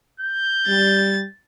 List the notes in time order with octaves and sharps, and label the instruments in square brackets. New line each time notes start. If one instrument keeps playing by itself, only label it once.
[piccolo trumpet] G6
[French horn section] G3 [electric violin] A6